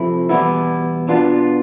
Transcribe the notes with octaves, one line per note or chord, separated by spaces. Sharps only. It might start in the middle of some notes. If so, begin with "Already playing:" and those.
Already playing: C3 F3 A3 C4 E4
E2 B2 G3 B3 E4
B2 B3 D4 F4